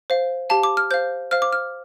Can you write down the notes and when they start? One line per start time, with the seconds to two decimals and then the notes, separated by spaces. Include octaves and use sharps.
0.10 C5 F5
0.50 G4 F5 A5
0.63 D6
0.77 F6
0.91 C5 F5 G6
1.31 C5 F5 F6
1.42 D6
1.53 F6